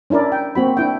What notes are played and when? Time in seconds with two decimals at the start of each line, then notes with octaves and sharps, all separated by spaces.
0.10 C#4 D4 E4 A#4 D5
0.32 G5
0.55 A#3 C4 F#4 B5
0.77 D4 E4 G5